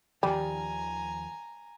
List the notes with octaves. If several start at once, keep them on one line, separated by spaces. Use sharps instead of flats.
D#2 D#3 F3 G3 G#5 A#5